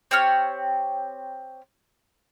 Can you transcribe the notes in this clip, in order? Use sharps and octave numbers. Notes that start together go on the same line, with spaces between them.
C4 G4 C#5 F6